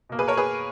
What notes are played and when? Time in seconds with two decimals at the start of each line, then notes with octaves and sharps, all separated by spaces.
0.09 B2 A#3
0.19 G#4 B4
0.28 A#4 C#5
0.37 G#4 B4